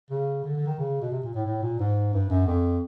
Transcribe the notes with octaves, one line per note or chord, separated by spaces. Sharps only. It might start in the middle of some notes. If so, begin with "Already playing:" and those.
C#3
D3
D3
D#3
C#3
B2
C3
A#2
A2
A2
A#2
G#2
G2
F#2
F2